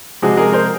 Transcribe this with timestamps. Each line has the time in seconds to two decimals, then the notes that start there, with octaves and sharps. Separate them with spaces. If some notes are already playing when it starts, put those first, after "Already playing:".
0.22 C3 F3 G#3 F#4 G#4
0.37 G#4 A#4
0.52 A#4 C5